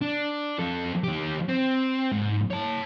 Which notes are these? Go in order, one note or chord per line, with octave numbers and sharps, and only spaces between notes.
D4
F2 A4
D#3 G4
C4
G#2
C#5 A5